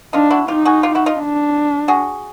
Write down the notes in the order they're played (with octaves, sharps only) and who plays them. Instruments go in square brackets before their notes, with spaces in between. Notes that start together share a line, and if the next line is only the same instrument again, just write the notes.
[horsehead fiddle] D4 [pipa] D#4 F4
[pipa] E4 F#4
[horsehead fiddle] D#4 [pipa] F4 G4
[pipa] F#4 G#4
F4 G4
E4 F#4
D#4 F4
[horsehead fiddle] D4
[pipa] F#4 G#4